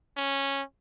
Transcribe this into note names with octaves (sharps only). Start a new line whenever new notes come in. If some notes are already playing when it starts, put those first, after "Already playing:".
C#4